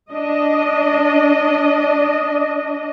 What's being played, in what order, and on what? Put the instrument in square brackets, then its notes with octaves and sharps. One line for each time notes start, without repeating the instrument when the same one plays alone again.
[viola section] D4 D#5